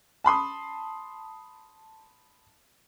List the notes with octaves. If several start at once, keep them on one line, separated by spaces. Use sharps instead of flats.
A5 B5 C6 D#6